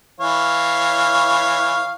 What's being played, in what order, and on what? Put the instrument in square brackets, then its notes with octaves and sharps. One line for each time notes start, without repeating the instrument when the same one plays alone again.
[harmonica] E3 C#5 F5